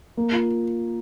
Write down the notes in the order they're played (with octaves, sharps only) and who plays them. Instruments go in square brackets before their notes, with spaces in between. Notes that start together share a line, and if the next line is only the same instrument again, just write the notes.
[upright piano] A#3
F4